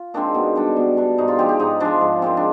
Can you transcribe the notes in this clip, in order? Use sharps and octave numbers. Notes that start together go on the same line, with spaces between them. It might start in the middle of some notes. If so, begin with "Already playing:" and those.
Already playing: F4
D#3 G#3 C4 D4
B2
G3 D4
B2
G3 D4
G#2 D#4
F4
F3 G#3 G4
G4
G#2 D#4
F3 G#3 D4
G#2
D#3 G#3 C4
D4